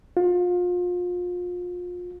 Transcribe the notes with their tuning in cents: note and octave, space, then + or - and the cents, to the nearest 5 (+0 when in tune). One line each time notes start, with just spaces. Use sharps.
F4 +30